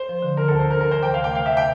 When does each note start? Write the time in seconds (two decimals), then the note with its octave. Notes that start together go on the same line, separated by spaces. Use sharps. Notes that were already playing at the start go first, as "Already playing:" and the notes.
Already playing: C5
0.09 F3
0.22 D3
0.37 D3 A#4
0.48 D2 A4
0.59 C5
0.66 D2 A#4
0.80 C3 A#4
0.91 E3 C5
1.03 G5
1.09 C3 F5
1.24 A3 G5
1.35 C3 F5
1.46 E5
1.53 C3 G5